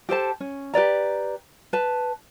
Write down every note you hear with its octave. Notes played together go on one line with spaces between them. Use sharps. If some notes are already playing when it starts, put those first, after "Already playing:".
G4 A4 C5 A5
C#4
G4 B4 D5 A#5
B4 A5